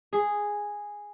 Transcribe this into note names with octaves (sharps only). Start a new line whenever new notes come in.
G#4